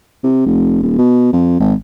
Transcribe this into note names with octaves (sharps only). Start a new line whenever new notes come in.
C3
F1
D#1
B2
F2
G#1